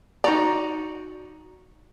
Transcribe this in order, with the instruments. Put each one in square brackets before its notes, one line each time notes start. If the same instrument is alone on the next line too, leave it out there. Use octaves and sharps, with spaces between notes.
[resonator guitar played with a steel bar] D#4 F#4 A#5 [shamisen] D5